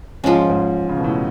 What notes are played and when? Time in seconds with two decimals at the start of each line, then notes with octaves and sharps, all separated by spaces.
0.24 G#2 F3 G#3 C#4
0.49 G#2
0.89 C#3
0.97 B2
1.04 A2